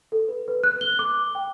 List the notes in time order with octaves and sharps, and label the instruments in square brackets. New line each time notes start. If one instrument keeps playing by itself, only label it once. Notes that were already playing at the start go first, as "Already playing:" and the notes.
[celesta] A4
B4
B4
F#6
G7
D6
G5